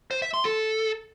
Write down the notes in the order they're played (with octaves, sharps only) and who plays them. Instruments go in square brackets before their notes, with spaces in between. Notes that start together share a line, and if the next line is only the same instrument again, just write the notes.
[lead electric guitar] C5
E5
C6
A4